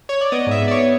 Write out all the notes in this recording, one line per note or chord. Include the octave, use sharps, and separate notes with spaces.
C#5
D5
B3 D#5
G#2 E5
B3
D5
C#5
B3